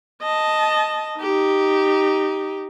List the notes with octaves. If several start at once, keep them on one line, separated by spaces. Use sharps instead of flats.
D#5 A5
D#4 G4